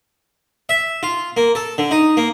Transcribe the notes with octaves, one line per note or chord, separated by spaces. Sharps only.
E5
F4
A#3
A4
D3
D#4
A#3